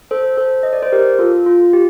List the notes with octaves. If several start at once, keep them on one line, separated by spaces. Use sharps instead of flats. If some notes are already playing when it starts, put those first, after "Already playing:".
A4 C5
A4 C5
D#5
D5
C5
G4 A#4
F4 A4
F4
G4